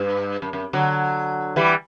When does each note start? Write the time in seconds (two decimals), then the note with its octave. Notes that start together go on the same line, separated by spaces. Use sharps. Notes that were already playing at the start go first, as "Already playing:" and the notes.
Already playing: G2
0.42 F#2
0.53 F#2
0.73 D3 F#3
1.56 E3 G3